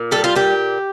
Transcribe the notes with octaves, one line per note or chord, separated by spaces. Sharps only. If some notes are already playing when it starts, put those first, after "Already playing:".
Already playing: A#2
G3 A4
F4
A#2 G4